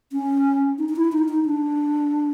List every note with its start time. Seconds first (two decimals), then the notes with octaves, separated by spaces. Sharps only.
0.12 C#4
0.78 D#4
0.89 D#4
0.96 E4
1.12 D#4
1.28 D#4
1.46 D4